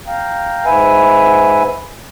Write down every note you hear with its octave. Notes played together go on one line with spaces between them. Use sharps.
F5 G5 A#5
G#2 B4 E5 G#5